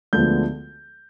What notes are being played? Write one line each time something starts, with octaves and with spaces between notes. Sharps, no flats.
D2 D3 F3 G#3 B3 G6